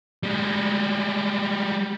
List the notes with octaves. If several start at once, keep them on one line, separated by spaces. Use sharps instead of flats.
G3 G#3